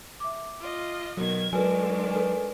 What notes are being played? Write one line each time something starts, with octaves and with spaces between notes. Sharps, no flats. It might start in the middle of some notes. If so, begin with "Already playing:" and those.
E5 D6
F4 D#5
B2 D#3 F#3 G#6
D#3 F#3 G#3 D4 A4 B4 G#5
A4 B4 G#5